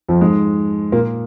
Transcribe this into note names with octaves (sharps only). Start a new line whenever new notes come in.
F2 F3
G#2 G#3
A#2 A#3